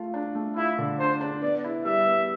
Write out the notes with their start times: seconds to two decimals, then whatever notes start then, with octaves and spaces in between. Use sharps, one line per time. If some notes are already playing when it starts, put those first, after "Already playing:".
Already playing: A3 F4
0.14 D4
0.35 A3
0.56 E4 F4
0.78 D3
0.99 D4 C5
1.21 D4
1.42 B3 D5
1.64 E4
1.85 G3 E5
2.06 B3